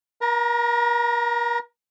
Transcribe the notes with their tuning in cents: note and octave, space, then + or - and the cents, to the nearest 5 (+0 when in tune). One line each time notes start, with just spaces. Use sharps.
A#4 +40 A#5 +0